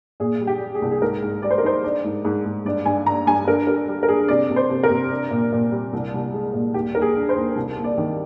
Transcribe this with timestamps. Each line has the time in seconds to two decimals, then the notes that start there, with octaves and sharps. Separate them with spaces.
0.20 A#2 G#4
0.41 G3
0.47 G4
0.61 G3
0.75 G#4
0.82 C2
0.91 G#4
1.01 G#2 A#4
1.23 G#2
1.42 G3 D5
1.50 C5
1.58 A#4
1.63 D#4 C5
1.84 D4 D5
2.04 G#2
2.25 G#2
2.45 G#2
2.65 G2 D5
2.85 G2 G#5
3.06 D3 A#5
3.27 G2 G#5
3.47 D3 A#4
3.67 G3 A#4
3.88 G3
4.03 A#4
4.09 D3 G#4
4.28 C3 D5
4.50 C3
4.56 C5
4.70 C3
4.83 A#4
4.90 C3
5.11 D4
5.31 A#2
5.52 A#2
5.72 G3
5.93 C2
6.14 C2
6.33 G#3
6.53 A#2
6.74 D#2 G4
6.95 D#2 A#4
7.02 G#4
7.15 D3
7.29 C5
7.36 D#2
7.56 C2
7.76 A#3
7.84 D5
7.98 D#3